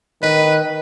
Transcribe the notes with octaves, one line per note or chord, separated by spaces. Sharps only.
D#3 B4 D#5